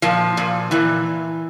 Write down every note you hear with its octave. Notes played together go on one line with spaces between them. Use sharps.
A#2 F3
A#2
A#2 E3